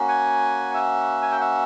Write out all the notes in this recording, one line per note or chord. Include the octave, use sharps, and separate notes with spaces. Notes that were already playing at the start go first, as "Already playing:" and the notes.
Already playing: A#3 C#4 F#4
F#5 G#5
E5 F#5
G#5
G5
E5 F#5